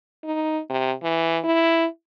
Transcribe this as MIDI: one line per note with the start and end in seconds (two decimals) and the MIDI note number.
0.25 0.59 63
0.70 0.92 48
1.03 1.39 52
1.44 1.86 64